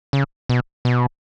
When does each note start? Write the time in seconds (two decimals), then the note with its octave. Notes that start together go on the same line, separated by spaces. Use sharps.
0.13 C#3
0.49 B2
0.85 B2